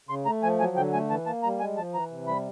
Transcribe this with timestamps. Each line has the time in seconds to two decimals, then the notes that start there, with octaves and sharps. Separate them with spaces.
0.09 C#3 C6
0.26 A3 A#5
0.43 F3 G#5
0.59 F#3 G#5
0.76 D3 G5
0.93 A3 G#5
1.10 E3 A5
1.26 A#3 A5
1.43 G3 A#5
1.60 G#3 G#5
1.77 F3 A5
1.94 E3 A#5
2.11 C3
2.27 G3 B5